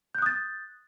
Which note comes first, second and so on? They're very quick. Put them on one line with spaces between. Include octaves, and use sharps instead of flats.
G6 F#6 D#6 A6